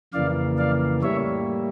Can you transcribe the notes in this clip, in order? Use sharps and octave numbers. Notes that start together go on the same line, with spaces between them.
F2 C#3 E3 A#3 D5 F5
D5 F5
A2 G3 A#3 C#5 E5